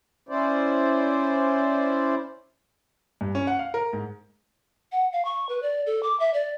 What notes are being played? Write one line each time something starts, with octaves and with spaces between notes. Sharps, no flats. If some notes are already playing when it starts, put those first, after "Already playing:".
C#4 E4 C5 D5
G2
C#4
F#5
F5
A#4
G#2
F#5
F5
C#6
B4
D5
A4
D6
E5
D5